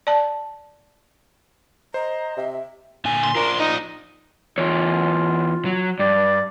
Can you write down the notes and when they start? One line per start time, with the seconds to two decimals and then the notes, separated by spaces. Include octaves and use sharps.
0.07 D5 A5
1.94 C5 D#5 A#5
2.37 C3 E5
3.05 A#2 D3 G#5
3.24 C6
3.35 F4 A#4 C5 D5
3.59 D#4 D#5
4.58 E2 F4 C#5
5.65 F#3
5.99 G2 D5